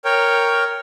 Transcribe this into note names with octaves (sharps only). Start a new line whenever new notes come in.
A#4 C#5 G5